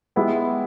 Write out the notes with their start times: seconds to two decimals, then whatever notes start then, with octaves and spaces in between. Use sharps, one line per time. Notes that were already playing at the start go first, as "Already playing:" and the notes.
0.16 G#3 B3 E4 G4